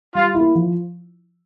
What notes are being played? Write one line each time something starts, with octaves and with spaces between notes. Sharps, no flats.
G3 F4
E4
A#3
F3